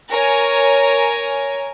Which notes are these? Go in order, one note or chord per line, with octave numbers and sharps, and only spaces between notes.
A#4 C#5 G#5